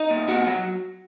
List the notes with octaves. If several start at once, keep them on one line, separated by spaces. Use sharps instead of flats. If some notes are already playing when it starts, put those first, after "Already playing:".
Already playing: D#4 D#5
A#2
A#2 F#4 F#5
F#3